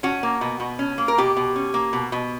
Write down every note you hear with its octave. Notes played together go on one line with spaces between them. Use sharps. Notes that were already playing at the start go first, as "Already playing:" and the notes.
C#4 F#4
A#3
B2
B2
C#4
A#3
A#4
B2 G4
B2
C#4
A#3
B2
B2